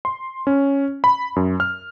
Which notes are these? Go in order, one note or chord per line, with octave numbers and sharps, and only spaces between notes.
C6
C#4
B5
F#2
F6